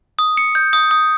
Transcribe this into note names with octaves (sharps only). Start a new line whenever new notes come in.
D#6
C#7
G6
D#6
D#6